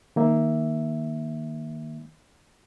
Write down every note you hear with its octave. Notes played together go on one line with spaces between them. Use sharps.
D#3 A#3 E5